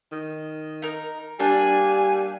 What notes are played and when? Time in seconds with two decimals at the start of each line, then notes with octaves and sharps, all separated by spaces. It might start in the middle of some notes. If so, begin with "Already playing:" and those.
0.12 D#3
0.82 D#4 A#4
1.39 G3 A#3 D4 G#5 A5